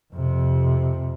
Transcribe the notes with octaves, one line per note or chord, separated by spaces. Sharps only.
F2 C3